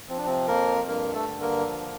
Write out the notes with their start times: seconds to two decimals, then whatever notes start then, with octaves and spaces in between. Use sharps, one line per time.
0.08 F3 C4
0.18 D4
0.26 C3 C4
0.48 F2 A#3 A#4
0.88 G2 A#3 A#4
1.14 A3 A4
1.28 D3
1.41 A#3 A#4
1.67 F3